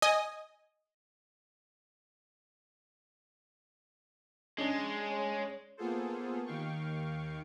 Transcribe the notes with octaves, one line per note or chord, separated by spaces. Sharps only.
D#5 G#5 D#6
G#3 C#4 D4
C#5
A#3 B3 F4 G#4 A4 C5
D#2 D#3 F5 G5 C#6